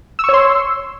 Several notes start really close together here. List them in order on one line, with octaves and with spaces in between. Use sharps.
E6 C#6 C#5 C6